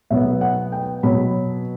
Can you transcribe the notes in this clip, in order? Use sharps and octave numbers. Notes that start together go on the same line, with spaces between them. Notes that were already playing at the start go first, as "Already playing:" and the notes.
B2 F#3 B3 E5
F#5
G5
B2 F#3 B3 B5